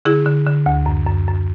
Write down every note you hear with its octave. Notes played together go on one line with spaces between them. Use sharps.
D3 E4 G#4
D3
D3
D2
F#2
F#2
F#2